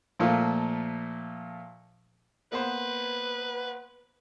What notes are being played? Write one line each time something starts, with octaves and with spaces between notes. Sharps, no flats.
A#2 F3 A3 A#3 F4
A#3 B3 B4 C5